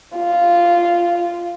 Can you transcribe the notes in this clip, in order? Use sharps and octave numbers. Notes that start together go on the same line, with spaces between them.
F4